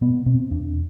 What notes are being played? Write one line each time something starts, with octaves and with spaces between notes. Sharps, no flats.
B2 B3
B2 C4
E2 D4